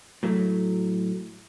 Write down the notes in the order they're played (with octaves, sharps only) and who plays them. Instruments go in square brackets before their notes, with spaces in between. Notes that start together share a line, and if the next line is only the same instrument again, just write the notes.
[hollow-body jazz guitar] A2 F#3 A3